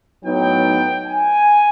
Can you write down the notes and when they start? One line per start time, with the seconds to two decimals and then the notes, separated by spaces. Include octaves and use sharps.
0.24 A2 F#3 B3 D#4 G5
1.07 G#5